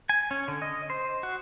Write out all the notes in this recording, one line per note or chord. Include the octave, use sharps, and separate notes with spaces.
G#5
C#4
D3
D#5
C5
F#4